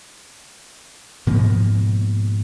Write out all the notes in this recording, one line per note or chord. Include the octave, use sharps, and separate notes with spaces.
G#2 B2 F3 A#3